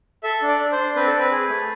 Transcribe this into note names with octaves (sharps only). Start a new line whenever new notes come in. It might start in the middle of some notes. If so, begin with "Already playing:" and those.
A4 E5
D4
D5
D4
C5
D4
C4 B4
A4
C4
B4
G#4
A3